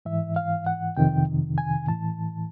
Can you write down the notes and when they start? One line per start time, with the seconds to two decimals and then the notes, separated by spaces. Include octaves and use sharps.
0.05 G#2 E3 E5
0.36 F5
0.66 F#5
0.97 F2 C3 D#3 G5
1.58 G#5
1.88 A2 E3 A5